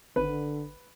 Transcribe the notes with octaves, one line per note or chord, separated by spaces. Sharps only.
G#1 D3 B4